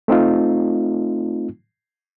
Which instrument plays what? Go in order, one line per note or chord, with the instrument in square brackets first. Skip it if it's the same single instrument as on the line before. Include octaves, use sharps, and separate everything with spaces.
[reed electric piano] A3 C4 D#4 F4